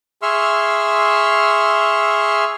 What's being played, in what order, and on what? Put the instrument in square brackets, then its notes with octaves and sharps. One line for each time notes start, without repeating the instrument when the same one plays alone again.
[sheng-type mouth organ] G#4 E5 C6 C#6 E6 F6